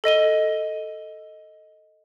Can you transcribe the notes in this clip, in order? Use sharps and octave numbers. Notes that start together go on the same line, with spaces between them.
A4 D#5 D#7 G7